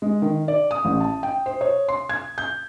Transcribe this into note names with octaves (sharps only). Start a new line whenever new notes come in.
G#3
D#3
D5
D#6
A1
A5
G5
C5
C#5
C6
G#6
G6